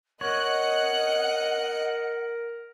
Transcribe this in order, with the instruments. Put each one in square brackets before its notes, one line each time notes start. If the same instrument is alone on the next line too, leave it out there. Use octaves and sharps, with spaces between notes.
[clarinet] A#4 [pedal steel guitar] C#5 [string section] D#5 F#6 C#7 [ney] F#5